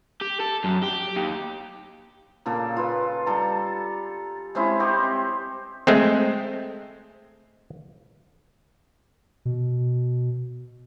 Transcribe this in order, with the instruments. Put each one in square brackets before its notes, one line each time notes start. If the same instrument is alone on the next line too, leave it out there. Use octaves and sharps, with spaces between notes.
[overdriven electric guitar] G4
A4
F#2
G4
D#2
[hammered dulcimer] A#2 C#3 A#3 A4
F4 B4
G3 A4 A#5
G#3 C4 C#4 E4
C4 G4 C#5 D#5
[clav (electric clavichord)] G#3 A3 C4
[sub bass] B2